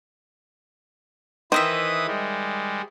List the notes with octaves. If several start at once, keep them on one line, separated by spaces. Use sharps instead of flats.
D#3 E3 B4 C5 D#5 E5 D#6
G3 G#3